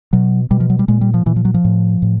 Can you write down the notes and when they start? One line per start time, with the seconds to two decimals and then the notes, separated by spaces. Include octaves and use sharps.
0.13 B2 F#3
0.51 B2 G3
0.60 F3
0.70 F#3
0.79 G3
0.88 A#2 G#3
1.01 G3
1.14 F3
1.26 A#2 E3
1.36 F3
1.45 F#3
1.54 F3
1.64 A2
2.02 A2